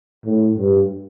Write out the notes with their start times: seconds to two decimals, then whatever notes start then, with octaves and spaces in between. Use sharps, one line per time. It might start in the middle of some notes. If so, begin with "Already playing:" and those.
0.25 A2
0.58 G2